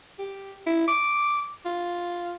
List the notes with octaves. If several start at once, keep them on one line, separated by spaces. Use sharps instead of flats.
G4
E4
D6
F4